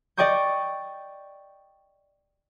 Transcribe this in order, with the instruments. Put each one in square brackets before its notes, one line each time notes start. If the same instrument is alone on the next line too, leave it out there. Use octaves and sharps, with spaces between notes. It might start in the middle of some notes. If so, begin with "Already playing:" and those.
[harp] D5 D#5 G5 C#6 D#6 G6